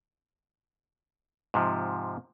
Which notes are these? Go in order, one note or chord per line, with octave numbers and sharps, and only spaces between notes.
G#2 C3 F3